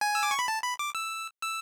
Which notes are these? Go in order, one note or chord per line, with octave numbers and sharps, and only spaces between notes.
G#5
E6
D6
C#6
B5
A5
B5
D6
E6
E6